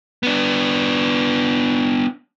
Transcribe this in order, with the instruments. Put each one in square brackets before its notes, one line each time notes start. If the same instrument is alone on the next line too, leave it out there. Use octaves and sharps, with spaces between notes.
[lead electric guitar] B3 D4